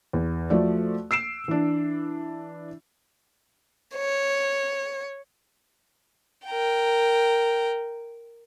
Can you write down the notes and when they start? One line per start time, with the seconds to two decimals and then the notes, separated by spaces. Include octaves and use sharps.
0.13 E2
0.50 F3 A3 F#4 A4 D5
1.11 E6 C7 D7 E7
1.48 E3 D4
3.95 C#5
6.47 A#4 G5